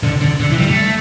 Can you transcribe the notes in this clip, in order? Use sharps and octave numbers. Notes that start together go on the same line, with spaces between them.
D3
D3
D3
E3
G3
A3